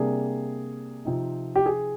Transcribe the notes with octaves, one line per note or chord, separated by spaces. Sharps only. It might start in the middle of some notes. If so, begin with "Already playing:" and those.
Already playing: C3 G3 A#3 D4 G#4
C3 F3 C4 D#4
G4
G#4